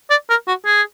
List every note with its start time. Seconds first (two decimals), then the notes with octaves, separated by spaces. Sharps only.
0.10 D5
0.29 A#4
0.48 F#4
0.65 G#4